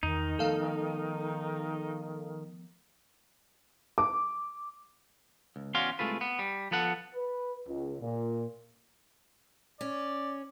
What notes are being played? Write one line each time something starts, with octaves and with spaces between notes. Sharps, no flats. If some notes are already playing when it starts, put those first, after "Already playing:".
E2 D#3 D#4
F3 A3 B3 A4 F5
D6
C#2
E2 C#4 F#4 D5 F5 C6
C2 C3 G#3 A3 F4 B4
B3
G3
F3 B3 A4 F#5
B4
C#2
A#2
C#4 D5